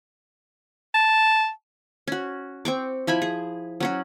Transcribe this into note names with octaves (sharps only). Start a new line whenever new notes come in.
A5
C#4 F#4
C4 C#6 D6
F3 E4 G#5 B5
G#4
F#3 C#4 F#4